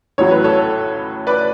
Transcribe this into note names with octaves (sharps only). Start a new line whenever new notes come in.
A1 A2 F#3 C#5
B4
A4 C#5
B4 D5